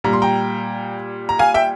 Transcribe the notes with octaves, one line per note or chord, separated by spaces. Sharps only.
A#2 G3 A#5
C6
G5 A#5
A#5
F5 G#5
E5 G5